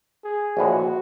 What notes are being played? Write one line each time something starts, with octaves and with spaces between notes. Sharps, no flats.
G#4
A#1 A2 E3 G#3 F#4